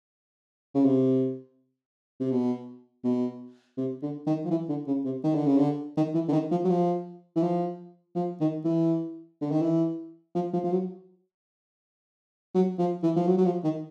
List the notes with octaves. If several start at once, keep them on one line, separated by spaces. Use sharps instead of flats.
C#3
C3
C3
B2
B2
C3
D3
D#3
F3
E3
D3
C#3
C3
D#3
D3
C#3
D3
D#3
E3
D3
D#3
F3
F#3
F3
E3
F3
F3
D#3
E3
D3
D#3
E3
F3
F3
F3
F#3
F#3
F3
E3
F3
F#3
F#3
F3
D#3